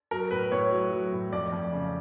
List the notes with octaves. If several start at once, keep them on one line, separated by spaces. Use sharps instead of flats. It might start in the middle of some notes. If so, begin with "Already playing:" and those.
F#3 A#4
A2 B4
A2 C#5
F#3
F#3
A2
F2 D5
F2
C#3